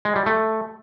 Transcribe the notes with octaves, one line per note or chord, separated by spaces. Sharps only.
G#3
G3
A3